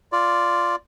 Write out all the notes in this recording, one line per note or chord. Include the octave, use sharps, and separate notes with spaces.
F4 D5